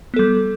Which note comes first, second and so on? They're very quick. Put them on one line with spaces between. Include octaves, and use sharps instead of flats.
B3 A4 G3